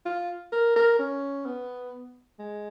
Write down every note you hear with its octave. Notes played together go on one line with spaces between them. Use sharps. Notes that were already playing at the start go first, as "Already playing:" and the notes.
F4
A#4
A#4
C#4
B3
G#3